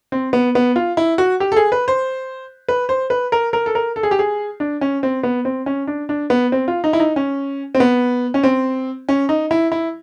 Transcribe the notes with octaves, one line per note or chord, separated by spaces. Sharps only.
C4
B3
B3
F4
E4
F#4
G4
A4
G#4
B4
C5
B4
C5
B4
A#4
A#4
A4
A#4
A4
G#4
G4
G#4
D4
C#4
C4
B3
C4
C#4
D4
D4
B3
C4
F4
D#4
E4
D#4
C#4
C4
B3
C#4
C4
C#4
D#4
E4
E4